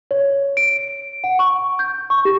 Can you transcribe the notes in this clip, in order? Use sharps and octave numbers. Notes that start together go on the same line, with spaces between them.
C#5
D7
F#5
C#6
G6
C#6
G4